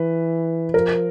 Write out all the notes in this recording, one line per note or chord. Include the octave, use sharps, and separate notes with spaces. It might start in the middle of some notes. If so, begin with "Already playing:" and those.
Already playing: E3 B4
F3 A#4